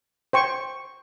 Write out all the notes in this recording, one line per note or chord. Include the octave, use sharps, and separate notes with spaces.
C5 G5 C#6